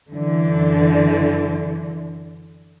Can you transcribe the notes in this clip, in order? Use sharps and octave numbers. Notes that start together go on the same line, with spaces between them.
F#2 D3 E3